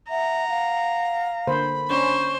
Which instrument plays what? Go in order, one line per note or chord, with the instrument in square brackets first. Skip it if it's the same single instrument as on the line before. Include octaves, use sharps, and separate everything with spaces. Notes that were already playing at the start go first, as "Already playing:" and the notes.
[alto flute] E5 [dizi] F#5 [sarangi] A#5
[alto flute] F5
[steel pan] D3 A#3 C5 [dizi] B5
[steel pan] C#4 D4 [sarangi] C5 [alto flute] C#6